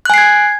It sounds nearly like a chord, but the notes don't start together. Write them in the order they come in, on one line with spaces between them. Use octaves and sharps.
F#6 G#5 C7 G#6